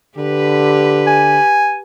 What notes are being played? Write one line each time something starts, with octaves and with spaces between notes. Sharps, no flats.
D3 G4 B4
G#5